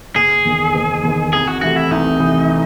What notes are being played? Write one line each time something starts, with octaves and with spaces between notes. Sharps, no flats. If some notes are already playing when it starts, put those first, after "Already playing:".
F#1 G#4
E2 D#3
F#1
E2 D#3
C2 G#4
F#4
C3 E3 A3 F#4
E4
C2 D#4
C3 E3 A3